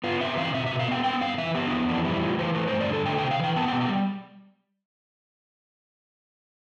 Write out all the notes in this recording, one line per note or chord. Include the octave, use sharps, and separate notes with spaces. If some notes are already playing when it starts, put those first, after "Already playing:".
B3 F4
C3 E5
E3 F5
B2 E5
E5
B2
F5
B3 G5
B3 G5
G2 F5
E3 E5
B3 G4
D4
F2 E4
E3 D4
G3 E4
A2 F4
E3 C5
A3 B4
C5
G2
D5
D3 A4
A3 G5
G5
C3
F5
E3 G5
B3 A5
G5
B2
G5
G3